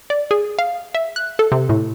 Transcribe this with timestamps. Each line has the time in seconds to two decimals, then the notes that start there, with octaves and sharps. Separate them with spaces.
0.10 D5
0.31 G#4
0.59 F5
0.95 E5
1.16 F#6
1.39 A4
1.52 C3
1.69 A2